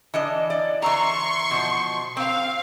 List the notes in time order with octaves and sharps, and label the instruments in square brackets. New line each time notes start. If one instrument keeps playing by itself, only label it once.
[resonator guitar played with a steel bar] E3 D4 D#5
D5
[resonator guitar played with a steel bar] E3 A#5 [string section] C6 C#6
[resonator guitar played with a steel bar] B2 F3
[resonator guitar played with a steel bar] C4 [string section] F5